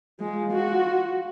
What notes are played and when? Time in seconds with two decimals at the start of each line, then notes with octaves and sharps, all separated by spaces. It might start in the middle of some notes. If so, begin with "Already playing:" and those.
0.20 G#3 F4
0.52 F#4